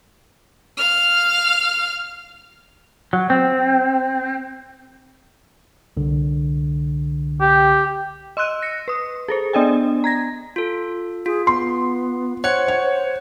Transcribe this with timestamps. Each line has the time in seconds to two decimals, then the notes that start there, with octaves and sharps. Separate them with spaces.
0.77 F5 F6
3.13 F#3
3.30 C4
5.97 C2 D3
7.41 G4
8.37 D#5 C6 E6 F#6 D#7
8.62 A#6 C#7
8.88 B4 D#6
9.28 G#4 A4 C5
9.53 B3 D4 D5 D#5 G5 G#5
10.04 A#5 G#6 A#6
10.56 F4 A4
11.26 F4 G#4
11.47 B3 C6
12.44 C5 C#5 F#5 F#6 C#7
12.68 C#5